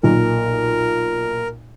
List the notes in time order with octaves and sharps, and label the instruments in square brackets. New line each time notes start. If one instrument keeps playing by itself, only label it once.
[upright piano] B1 A#2 [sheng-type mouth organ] A#4